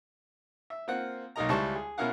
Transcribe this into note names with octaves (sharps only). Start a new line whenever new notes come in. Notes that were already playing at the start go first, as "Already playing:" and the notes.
E5
A#3 C4 F4 F#5
B1 A#3 D#4 A#4 D#5 A#5
C#2 G3 E4 C5 A5 C#6
G#4
B2 C#4 E4 A#4 F5 F#5